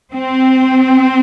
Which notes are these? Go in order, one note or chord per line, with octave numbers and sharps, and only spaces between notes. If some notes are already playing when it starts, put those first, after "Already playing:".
C4